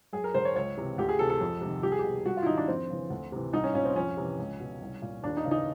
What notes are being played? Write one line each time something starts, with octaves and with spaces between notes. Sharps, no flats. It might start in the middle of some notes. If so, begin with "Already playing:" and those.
F#2 G#4
A#4
D3 C5
C#5
C#2 C#5
C3 E3
D2 G4
G#4
C3 E3 A4
A4
F2
C3 D#3
C2 G4
G#4
B2 G4
G2 F#4
F4
E4
D#3 D#4
D4
F2 C4
C#3 E3
D2
C3 E3
C2 D#4
C#4
A#2 C#4
C4
F2 C#4
C3 E3
C#2
B2
C2
A#2
D#2 D4
D#4
C#3 E3
D#4